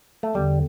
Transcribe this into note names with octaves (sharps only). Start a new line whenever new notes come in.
A3
E2 D3 G3